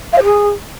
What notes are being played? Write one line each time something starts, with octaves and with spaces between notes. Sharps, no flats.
F5
C#5
G#4